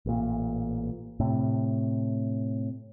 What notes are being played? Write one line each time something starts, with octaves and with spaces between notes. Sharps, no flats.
A1 A#2
A2 C3